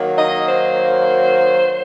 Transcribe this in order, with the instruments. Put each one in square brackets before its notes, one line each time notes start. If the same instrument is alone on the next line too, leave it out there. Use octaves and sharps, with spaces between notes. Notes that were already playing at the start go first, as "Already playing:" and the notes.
Already playing: [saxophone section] D#3 F#3 A#3
D#5
C5
C5